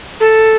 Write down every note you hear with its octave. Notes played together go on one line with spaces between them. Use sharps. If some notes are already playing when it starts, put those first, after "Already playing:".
A4